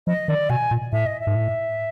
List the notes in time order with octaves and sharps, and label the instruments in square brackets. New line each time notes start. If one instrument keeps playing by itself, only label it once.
[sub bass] F3 [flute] D#5
[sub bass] D#3 [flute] D5
[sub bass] B2 [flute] G#5
[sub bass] A#2
[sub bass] A2 [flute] E5
[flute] D#5
E5
[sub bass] G#2
A2